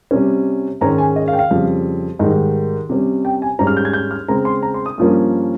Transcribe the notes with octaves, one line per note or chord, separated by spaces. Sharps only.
C3 G3 C#4
G#2 D#3 G#3 C#4 A#5
G#5
D#5
F5
G5
F5
F2 C#3 G3
G#2 D#3 G3 D#5
C3 G3 C#4
G5
G#5
G#2 G3 C#4 A#5
F6
G6
G#6
G6
F6
C#3 G#3 C4 A#5
C6
A#5
C6
D#6
G2 F3 A#3 C#4